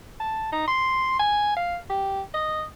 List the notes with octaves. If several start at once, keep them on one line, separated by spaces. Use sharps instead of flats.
A5
D#4
C6
G#5
F5
G4
D#5